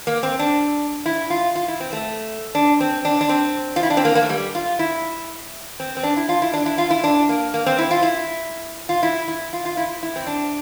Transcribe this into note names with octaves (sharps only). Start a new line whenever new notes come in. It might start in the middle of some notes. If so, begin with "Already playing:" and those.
A#3
C4
D4
E4
F4
F4
E4
C4
A3
D4
C4
D4
D4
C4
F4
E4
D4
C4
A#3
A#3
A3
G3
F4
E4
C4
C4
D4
E4
F4
E4
D4
E4
F4
E4
D4
A#3
A#3
C4
E4
F4
E4
F4
E4
E4
F4
F4
E4
E4
C4
D4